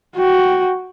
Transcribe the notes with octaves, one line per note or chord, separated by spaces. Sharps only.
F#4 G5